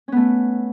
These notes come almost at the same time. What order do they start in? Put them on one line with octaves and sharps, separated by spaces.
C#4 B3 A3